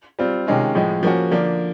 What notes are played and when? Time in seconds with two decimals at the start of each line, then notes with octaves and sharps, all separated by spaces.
0.19 G3 C4 F4
0.47 C3 D#3 G#3 C#4 F4
0.75 A2 F3 G#3
1.03 F3 A#3 C#4 F#4
1.31 D3 F3 A#3 D4